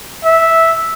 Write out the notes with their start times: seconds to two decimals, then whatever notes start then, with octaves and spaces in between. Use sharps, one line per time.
0.25 E5